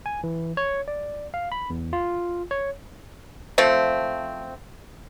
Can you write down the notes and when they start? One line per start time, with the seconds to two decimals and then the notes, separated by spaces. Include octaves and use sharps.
0.06 G#5
0.23 E3
0.57 C#5
0.88 D5
1.34 F5
1.52 B5
1.70 E2
1.93 F4
2.51 C#5
3.58 F3 A3 C4